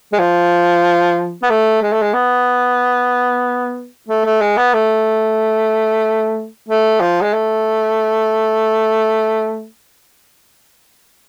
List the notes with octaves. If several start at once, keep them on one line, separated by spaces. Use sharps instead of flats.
G#3
F3
B3
A3
G#3
A3
G#3
B3
A3
A3
G#3
B3
A3
A3
F3
G#3
A3